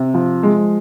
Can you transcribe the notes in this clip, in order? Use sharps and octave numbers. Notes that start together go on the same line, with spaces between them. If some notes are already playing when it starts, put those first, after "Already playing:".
Already playing: C3
F3
G#3